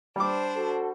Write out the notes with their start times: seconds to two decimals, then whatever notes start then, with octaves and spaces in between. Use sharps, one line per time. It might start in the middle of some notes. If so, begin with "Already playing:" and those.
0.16 G3 D4 C5 D6
0.55 F#4 A4